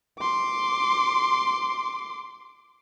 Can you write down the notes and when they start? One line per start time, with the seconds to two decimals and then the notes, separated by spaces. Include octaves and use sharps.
0.19 C6 D6